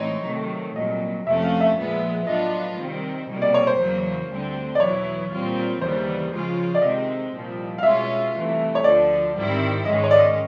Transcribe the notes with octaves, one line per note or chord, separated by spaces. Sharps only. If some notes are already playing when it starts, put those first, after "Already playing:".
Already playing: A2 E3 G#3 C4 D#4 C#5
C3 D#3 F#3 A3
C2 A#2 F#3 D#5
F2 C3 F3 A3 C#4 E5
F5
E5
A#2 F3 G#3 B3
A2 F#3 B3 D4 F4 D#5
C3 D#3 G3 C4
C2 B2 G3 A#3
D5
C#5
C5
E2 C#3 F#3 A#3
D2 D3 G3 C4
D5
E2 B2 F#3 B3 E4 C#5
A#2 G3 C4 F4
D#2 C#3 E3 G3 B3 C5
C#3 F3 G#3 C#4 F4
D5
C3 D#3 G#3 C4 D#5
C2 A#2 F3
F5
B2 G#3 C#4 F4 E5
C2 C3 E3 A3
C#5
D2 D3 F3 D5
G#2 D#3 G3 C4 E4
G#2 D#3 G#3 C#4 D#5
C#5
D5
D#5